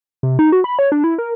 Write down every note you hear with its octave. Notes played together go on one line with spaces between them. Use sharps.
C3
D#4
F#4
B5
C#5
D4
E4
A#4